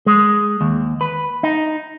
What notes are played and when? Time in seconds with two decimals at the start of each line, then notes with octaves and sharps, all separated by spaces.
0.06 G#3
0.61 D#2
1.01 B4
1.43 D#4